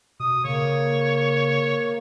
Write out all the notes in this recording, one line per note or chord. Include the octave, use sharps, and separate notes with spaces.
B2 D#6
C#3 A#3 C#5